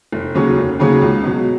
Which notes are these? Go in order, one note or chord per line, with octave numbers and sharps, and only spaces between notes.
F1
D#2 C#3 F#3 C#4
F1
D#2 C#3 F#3 C#4
C#2
B2 F#3